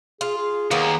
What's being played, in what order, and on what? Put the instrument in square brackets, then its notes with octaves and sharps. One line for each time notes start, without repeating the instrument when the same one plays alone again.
[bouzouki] F4 [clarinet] G#4
[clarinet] G#4
[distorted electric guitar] D#2 [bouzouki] A#3 B3